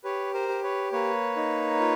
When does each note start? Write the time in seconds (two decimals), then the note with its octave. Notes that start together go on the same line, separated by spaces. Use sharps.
0.04 G4 B4 C#5
0.34 A#4 C5
0.48 G4
0.63 B4 C#5
0.92 A#3 B4 C#5
1.37 D#4
1.80 F4